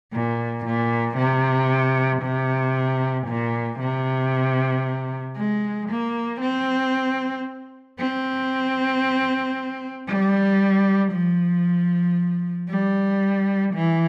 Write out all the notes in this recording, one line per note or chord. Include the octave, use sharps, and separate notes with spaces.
A#2
A#2
C3
C3
A#2
C3
G#3
A#3
C4
C4
G3
F3
G3
E3